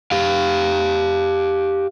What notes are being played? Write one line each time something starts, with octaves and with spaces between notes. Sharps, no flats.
G4 F5